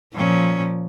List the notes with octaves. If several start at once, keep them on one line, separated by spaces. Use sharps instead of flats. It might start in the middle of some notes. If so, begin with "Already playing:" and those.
A#2 F3 C#4